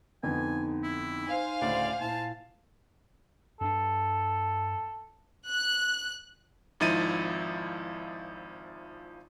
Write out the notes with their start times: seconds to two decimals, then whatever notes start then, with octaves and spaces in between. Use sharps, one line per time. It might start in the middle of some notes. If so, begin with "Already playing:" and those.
0.23 F2 D3 B3 D#4 G#5
0.83 E4
1.28 C5 F5 G#5
1.62 D2 A2 C#3 D5
2.01 A#2 E4 A5
3.61 G2 D4 A4
5.48 F#6
6.80 G#1 F3 D#4 E4 A6 D#7